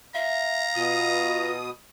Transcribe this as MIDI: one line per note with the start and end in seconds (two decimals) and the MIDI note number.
0.15 0.64 76
0.15 1.58 77
0.15 1.56 82
0.75 1.70 47
0.75 1.52 65
0.75 1.70 87